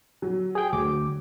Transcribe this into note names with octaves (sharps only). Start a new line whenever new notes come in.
F#3
G#4 G5
D2 D6